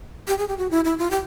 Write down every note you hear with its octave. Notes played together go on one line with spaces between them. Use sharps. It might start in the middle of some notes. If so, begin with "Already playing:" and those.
G4
G#4
G4
F#4
E4
E4
F4
G4